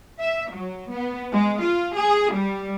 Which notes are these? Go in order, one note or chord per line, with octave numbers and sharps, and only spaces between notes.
E5
F#3
B3
G#3
F4
G#4
G3